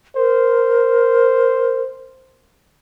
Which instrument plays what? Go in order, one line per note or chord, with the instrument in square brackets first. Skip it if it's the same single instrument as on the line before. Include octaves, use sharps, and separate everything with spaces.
[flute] A#4 [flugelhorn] C5